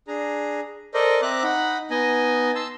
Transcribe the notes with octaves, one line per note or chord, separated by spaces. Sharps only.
D4 G#4 A#5
A4 A#4 C5 D5 D#5
C4 E5 A#5 D6 F#6
D#4 F#5 B5
B3 D#4 D#5 G#5
A5 C6 E6